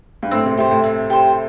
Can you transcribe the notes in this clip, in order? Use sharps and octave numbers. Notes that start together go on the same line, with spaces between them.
G2
A2 C4
C3
C3 G4 C5
A2
C4
G4 C5